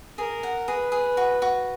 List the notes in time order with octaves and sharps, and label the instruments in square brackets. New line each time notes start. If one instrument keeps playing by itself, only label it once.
[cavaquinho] G#4 [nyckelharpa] A#4
[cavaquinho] F#5
[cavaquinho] G#4 [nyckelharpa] B4
[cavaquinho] G#4
F#4
F#4